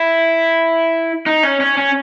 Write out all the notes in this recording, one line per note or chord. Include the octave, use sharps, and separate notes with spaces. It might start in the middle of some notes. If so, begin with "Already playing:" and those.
Already playing: E4
D#4
C#4
C#4
C#4